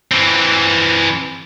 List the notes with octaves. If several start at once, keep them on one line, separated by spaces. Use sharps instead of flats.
E3 C4